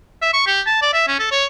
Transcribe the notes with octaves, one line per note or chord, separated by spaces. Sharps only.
E5
C#6
G4
A5
D5
E5
C#4
A4
C#5